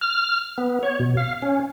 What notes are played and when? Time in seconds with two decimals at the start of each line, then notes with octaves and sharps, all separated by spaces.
0.01 F6
0.58 B3
0.83 C#5
0.99 B2
1.17 F5
1.42 C#4